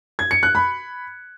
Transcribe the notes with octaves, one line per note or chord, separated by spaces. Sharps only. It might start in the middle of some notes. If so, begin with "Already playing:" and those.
G#6
C#7
F#6
B5